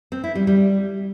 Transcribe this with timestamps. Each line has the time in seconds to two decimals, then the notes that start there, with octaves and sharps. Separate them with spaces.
0.12 C4
0.24 E4
0.35 G3
0.47 G3